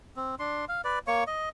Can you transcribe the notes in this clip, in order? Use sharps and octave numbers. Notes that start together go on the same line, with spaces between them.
C4
D4 C6
F5
B4 D5
A#3 C#5 C#6
D#5